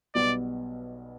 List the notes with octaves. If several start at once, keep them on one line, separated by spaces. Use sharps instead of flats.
B1 B2 G3 B3 D5